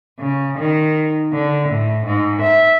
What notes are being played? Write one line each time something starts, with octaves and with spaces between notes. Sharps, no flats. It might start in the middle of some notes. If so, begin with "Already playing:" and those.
C#3
D#3
D3
A2
G#2
E5